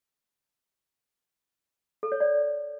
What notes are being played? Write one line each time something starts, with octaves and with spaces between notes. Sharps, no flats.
A4
C#5
D5